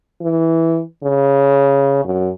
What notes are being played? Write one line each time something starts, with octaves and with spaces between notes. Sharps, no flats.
E3
C#3
F#2